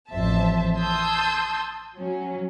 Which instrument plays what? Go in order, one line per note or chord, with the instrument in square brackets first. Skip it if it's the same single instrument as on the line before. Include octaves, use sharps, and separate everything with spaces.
[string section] A1 F2 C5 E5 A5
A5 C6 D#6 E6 G6 G#6
F#3 C#4